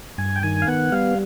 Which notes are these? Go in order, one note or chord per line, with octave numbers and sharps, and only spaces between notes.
G2 G#5
G5
D#3 G#5
F5
B3 F#5
G3 F5